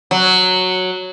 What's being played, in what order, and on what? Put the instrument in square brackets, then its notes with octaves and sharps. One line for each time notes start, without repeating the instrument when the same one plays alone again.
[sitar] F#3